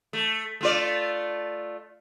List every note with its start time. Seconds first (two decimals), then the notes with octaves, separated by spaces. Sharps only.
0.13 A3
0.61 A3 F4 D5